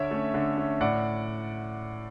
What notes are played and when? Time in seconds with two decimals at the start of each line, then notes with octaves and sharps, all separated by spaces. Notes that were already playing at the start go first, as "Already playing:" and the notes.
Already playing: D3 C#5 E5
0.11 A3 C#4
0.34 D3
0.58 A3 C#4
0.81 A2 D5 F#5